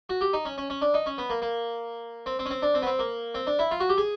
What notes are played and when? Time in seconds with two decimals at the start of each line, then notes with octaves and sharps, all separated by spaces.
0.09 F#4
0.21 G4
0.33 D#4
0.45 C#4
0.58 C#4
0.70 C#4
0.82 D4
0.94 D#4
1.06 C#4
1.18 B3
1.30 A#3
1.42 A#3
2.26 C4
2.39 C4
2.46 C#4
2.51 C4
2.62 D4
2.74 C4
2.82 B3
2.87 C4
2.99 A#3
3.35 C4
3.47 D4
3.59 E4
3.71 F4
3.80 F#4
3.89 G4
3.98 G#4